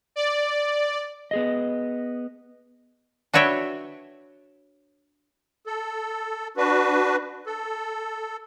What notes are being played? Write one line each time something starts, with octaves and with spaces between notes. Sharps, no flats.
D5
B3 G#4 D#5
D4 F#4 B4 C#5 E5 G5
A4
D4 F#4 B4
A4